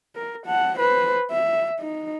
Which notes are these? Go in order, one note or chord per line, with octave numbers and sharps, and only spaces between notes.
A#4
F#5 A5
B4 C5
E5
D#4